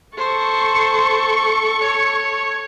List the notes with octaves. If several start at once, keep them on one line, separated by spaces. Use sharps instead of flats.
A4 C5 C#6
C#5